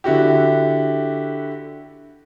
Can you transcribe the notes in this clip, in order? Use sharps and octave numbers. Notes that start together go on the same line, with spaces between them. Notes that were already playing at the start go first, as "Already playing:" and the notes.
D3 E4 F#4 G4